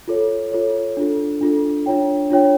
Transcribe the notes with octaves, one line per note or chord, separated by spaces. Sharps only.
F4 A4 C#5
F4 A4 C#5
D4 F4 A4
D4 F4 A4
D4 F4 C#5 G5
D4 F4 C#5 G5